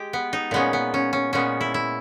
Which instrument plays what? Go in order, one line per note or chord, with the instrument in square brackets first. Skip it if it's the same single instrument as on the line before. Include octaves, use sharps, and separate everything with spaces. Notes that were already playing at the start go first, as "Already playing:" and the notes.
Already playing: [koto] G#3 G4
B3
D#4
A#2 G#3 B3 C#4
B3
C#4
C#4
A#2 G#3 B3 C#4
E4
E4